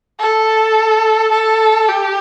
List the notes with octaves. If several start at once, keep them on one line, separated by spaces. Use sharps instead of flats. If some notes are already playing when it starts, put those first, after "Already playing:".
A4
A4
G4